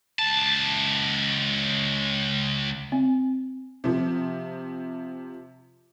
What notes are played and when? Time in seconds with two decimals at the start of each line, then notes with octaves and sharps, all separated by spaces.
0.19 C#2 A5
2.92 C4
3.84 C3 F3